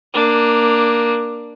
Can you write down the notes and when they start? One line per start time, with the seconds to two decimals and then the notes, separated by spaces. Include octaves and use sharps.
0.14 A#3 D4